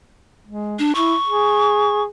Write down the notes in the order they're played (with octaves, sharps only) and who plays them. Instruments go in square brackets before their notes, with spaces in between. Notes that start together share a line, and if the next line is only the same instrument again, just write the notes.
[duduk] G#3
[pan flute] D4
[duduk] E4 [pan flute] C#6
[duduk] G#4